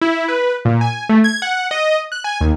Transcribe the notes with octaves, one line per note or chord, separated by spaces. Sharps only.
E4
B4
A#2
G#5
A3
G#6
F#5
D#5
F#6
G#5
D#2